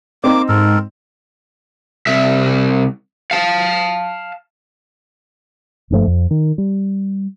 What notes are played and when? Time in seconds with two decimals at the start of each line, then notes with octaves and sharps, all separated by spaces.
0.24 A#3 C4 D#4 D6
0.48 G#2 A4 A#4
2.07 C2 E5
3.31 F5 A5
5.90 F#1 G2 F3 A3
6.07 F2
6.31 D#3
6.58 G3